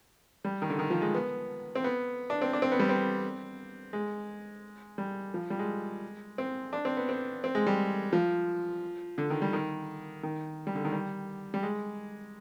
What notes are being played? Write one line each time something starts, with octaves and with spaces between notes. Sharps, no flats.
G3
D#3
D3
D#3
F3
G#3
B3
C4
B3
D4
C4
D4
C4
B3
G3
C4
G#3
G3
F3
G3
G#3
C4
D4
C4
B3
C4
C4
G#3
G3
F3
D3
D#3
G3
D#3
D#3
G3
D3
D#3
G3
G3
G#3